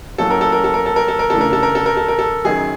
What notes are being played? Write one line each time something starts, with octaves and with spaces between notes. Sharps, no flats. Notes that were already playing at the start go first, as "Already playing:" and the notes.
A2 F#3 A#3 C#4 A4
A#4
A4
A#4
A4
A#4
A4
A#4
A4
A#4
C#3 E3 A3 D4 A4
A#4
A4
A#4
A4
A#4
A4
A#4
A4
F#2 D#3 F#3 G#4